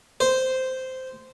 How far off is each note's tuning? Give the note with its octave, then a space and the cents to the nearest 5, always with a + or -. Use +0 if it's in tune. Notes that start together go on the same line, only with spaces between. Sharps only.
C5 -10